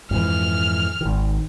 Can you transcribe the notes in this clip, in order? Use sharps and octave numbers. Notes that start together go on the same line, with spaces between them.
F2 G#2 E3 F6
G#1 D#3